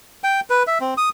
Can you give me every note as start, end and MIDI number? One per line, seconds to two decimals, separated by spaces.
0.24 0.40 79
0.50 0.63 71
0.67 0.78 76
0.80 0.94 60
0.97 1.09 87